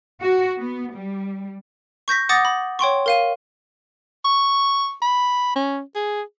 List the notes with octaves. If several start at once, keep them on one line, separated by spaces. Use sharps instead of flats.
F#4
B3
G3
C#6 G6 A#6 B6
F#5 D6 D#6 A6 A#6
B5
C#5 G5 C6 C#6
A#4 F5 D#7
C#6
B5
C#4
G#4